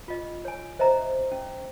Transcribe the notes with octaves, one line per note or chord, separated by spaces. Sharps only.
F4 D#5
C#5 G#5
C5 D#5 E5 A#5
C#4